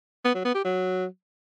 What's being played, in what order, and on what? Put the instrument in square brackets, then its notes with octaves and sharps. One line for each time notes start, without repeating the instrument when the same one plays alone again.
[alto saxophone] B3
F#3
B3
G4
F#3